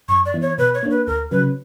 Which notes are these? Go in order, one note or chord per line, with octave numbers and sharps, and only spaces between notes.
F#2 C#6
D5
E3 B3 E4
C#5
B2 B4
C#5
A#3 D4
B4
D2 A#4
C#3 F#3 C#4 B4